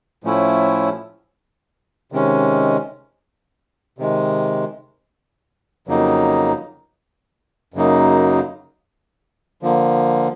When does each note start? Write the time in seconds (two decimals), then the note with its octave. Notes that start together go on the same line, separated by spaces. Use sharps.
0.24 A2 F3 A3 C#4 E4
2.12 C3 D#3 G#3 C#4
3.99 C3 D#3 G#3
5.87 F2 C#3 F#3 A#3 D#4
7.74 F#2 C#3 F#3 A#3 D#4
9.63 D3 F3 A#3